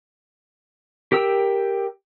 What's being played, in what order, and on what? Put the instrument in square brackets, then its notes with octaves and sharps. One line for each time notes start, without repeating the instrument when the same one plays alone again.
[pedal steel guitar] G4 A#4 G5 E6